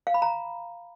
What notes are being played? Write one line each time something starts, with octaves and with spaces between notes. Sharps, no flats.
F5
B5
A#5